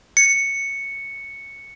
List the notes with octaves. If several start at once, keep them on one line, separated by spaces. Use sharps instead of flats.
C#7